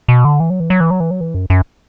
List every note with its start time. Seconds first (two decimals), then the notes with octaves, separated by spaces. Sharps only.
0.08 B2
0.25 D3
0.40 E3
0.50 F#3
0.60 E3
0.70 F#3
0.80 E3
0.91 F#3
1.00 E3
1.11 F#3
1.21 E3
1.34 F#2
1.50 F#2